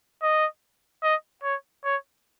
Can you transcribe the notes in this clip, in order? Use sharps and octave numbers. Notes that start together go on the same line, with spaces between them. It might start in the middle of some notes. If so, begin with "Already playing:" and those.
D#5
D#5
C#5
C#5